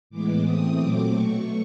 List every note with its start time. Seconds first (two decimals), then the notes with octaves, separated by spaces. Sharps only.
0.10 A2 E3 G#3 B3 D6
0.44 E3 A3 C4 D#6
0.77 A#2 F#3 A3 C4 D6
1.12 B2 F#3 A3 C#6